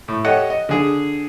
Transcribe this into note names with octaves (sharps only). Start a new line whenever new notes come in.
A2
G4 A4 C#5 D#5 F#5
D#5
D3 G#4